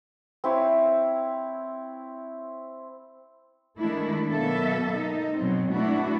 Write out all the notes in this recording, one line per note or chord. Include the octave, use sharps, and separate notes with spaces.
C4 E4 C#5
D#3 G#3 A3 D4 E4
B2 F#3 A#3 B3 A4 E5
D#4
B2 F#3 C4
A3 B3 D4 E4 F#4